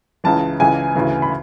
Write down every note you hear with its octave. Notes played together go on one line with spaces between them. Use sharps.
C#2 C#3 E3 A5
C#2 C#3 E3 G#5
D2 C#3 E3
B5